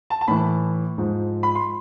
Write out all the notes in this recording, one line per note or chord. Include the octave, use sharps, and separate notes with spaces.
A5
A5
A2 E3 B5
G#2 F3
B5
C6